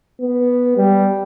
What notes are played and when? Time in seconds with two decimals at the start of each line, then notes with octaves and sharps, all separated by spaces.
0.21 B3
0.77 G3